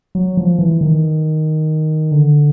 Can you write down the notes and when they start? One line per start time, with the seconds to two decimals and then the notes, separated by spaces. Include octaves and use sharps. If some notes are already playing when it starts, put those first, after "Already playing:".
0.15 F#3
0.37 F3
0.59 E3
0.81 D#3
2.11 D3